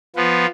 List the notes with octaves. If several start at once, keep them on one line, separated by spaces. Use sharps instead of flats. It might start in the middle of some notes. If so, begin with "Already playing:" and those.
F3 B3 F4